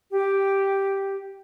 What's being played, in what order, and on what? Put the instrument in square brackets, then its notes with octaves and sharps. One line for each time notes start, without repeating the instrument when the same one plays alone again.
[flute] G4